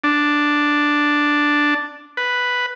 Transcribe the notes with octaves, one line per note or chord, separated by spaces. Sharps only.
D4
B4